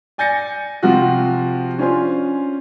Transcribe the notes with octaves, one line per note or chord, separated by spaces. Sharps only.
D5 G#5 G6 A6 A#6 C#7
C3 F3 F4 F#4
C#4 D4 F4 C5 G#5 C6